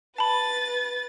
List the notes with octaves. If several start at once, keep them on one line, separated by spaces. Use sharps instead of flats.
B4 A5 B5 A6